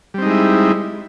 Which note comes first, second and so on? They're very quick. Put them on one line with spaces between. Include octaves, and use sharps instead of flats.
G3 C4 D#4 G#3 E4